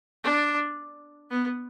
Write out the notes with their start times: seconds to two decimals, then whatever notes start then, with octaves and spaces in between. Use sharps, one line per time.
0.24 D4
1.31 B3